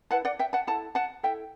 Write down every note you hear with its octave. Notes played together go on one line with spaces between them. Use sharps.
E4 B4 F#5 A5
D5 F#5
E5 G5
F#5 A5
E4 A4 F#5 A5
F#5 A5
E4 A4 E5 G5